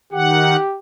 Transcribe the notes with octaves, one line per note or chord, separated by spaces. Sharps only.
D#3 G4 F#5